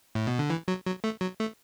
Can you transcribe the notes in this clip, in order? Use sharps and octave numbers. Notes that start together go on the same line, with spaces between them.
A2
B2
D3
E3
F#3
F#3
A3
F#3
A3